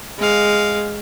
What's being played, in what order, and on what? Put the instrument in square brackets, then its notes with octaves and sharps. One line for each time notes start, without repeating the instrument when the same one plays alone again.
[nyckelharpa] G#3 F5